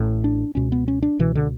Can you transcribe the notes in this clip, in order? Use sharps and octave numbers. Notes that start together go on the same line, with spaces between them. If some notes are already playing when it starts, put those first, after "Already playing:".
Already playing: A1 A2
D4
C#2 B2 C#4
B3
C#4
D4
C#2 B2 E3
D3